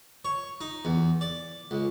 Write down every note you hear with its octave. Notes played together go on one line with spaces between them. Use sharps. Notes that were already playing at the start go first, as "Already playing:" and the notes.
C#5
D#4
E2
D5
C#2